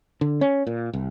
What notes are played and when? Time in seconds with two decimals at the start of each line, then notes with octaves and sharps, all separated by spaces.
0.21 D3
0.41 C#4
0.67 A#2
0.93 C2